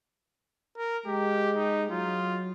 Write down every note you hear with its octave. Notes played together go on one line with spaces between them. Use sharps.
A#4
G#3 G4
D#4
F#3 F4